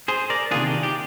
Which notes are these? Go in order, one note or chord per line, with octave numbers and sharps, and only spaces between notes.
G#4 C5
A#4 D5
C3 D#3 A#3 D4 F4 G#4
G4
G4